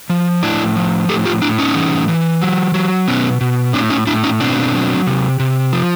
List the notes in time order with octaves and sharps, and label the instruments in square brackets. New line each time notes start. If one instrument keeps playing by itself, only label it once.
[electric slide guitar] F3
A2 D4 E4
F3
A2 G4 A4
F4 G4
A2 D4 E4
C#4 D#4
E3
E3
F#3
F#3
B2 B3 C#4
B2
A2 C4 D4
C#4 D#4
A2 D4 E4
C#4 D#4
B2 C4 D4
F#3
C3
C3
F3